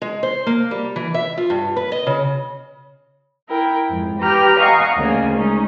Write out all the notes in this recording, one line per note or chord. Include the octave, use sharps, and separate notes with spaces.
G#3
C5
A#3
G3
E3
E5
F4
G2
B4
D#5
C#3
E4 A#4 G5
F2 G#2
G4 B4 A#5 F6 G6
D#5 F5 F#5 G#5 A#5 C#6
D2 C#3 A#3 G#5
G#3 C#4 D#4